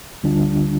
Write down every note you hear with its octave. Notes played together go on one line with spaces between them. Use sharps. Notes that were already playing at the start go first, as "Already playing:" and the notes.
D2 D3 G3 D4 F4